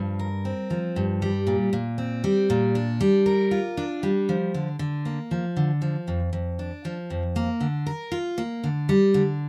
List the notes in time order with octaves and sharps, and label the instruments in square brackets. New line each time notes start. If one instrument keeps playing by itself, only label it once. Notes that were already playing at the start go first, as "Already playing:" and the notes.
Already playing: [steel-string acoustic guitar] G2 F3
A#4
C4
F3
G2
G3
A#2
A#2
C4
G3
A#2
D4
G3
A#4
F4
D4
G3
F3
D3
D3
A#3
F3
D3
F3
F2
F2
D4
F3
F2
A#3
D3
A#4
F4
A#3
D3
G3
D3